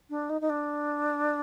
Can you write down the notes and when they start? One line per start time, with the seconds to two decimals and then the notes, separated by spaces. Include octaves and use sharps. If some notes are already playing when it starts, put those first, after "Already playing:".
0.09 D4
0.29 D#4
0.41 D#4
0.49 D4